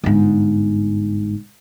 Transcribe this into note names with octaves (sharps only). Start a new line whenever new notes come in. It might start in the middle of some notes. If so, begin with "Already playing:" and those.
G1 G#2